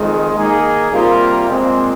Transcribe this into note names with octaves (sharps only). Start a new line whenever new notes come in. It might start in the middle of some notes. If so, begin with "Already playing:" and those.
Already playing: F2 D#3 G#3
D#3 A#3 D#4 G#4
C3 G3 A#3 F4 A#4
A#2 G#3 C4